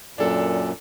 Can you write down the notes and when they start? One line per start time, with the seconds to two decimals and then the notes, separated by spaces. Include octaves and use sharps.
0.18 F#2 A#2 D4 A4